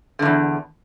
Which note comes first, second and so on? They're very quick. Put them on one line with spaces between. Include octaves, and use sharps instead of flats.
D3 G#2 E2